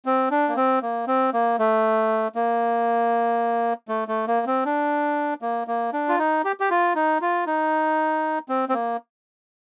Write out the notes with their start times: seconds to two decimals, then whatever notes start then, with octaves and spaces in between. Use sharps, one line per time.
0.06 C4
0.31 D4
0.49 A#3
0.56 C4
0.82 A#3
1.07 C4
1.33 A#3
1.59 A3
2.35 A#3
3.88 A3
4.08 A3
4.28 A#3
4.47 C4
4.65 D4
5.42 A#3
5.67 A#3
5.93 D4
6.09 F4
6.19 D#4
6.44 G4
6.60 G4
6.70 F4
6.95 D#4
7.21 F4
7.47 D#4
8.49 C4
8.69 C4
8.74 A#3